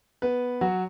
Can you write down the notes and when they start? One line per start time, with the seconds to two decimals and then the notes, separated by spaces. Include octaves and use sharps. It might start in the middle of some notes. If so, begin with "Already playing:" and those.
0.22 B3 B4
0.61 F#3 F#4